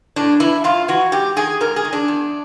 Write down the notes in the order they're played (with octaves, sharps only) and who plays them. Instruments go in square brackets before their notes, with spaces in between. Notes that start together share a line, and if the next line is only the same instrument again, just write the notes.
[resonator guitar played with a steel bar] A2 D4
E3 E4
G2 F4
E3 F#4
G#2 G4
D#3 G#4
G#2 A#4
G#4
D#3
D4
E2